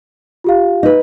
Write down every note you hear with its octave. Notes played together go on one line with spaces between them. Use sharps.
F4 G4 F5
D#4 B4